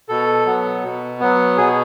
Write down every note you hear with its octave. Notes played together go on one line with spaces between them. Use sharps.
B2 A4
F#3 B3
B2
F#3 B3
B2 G#4